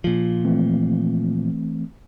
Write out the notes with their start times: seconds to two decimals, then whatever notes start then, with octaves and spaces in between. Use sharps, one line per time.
0.04 A#2 F3
0.45 E3 A3 C4